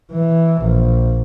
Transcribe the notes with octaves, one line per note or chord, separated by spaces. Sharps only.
E3
A#1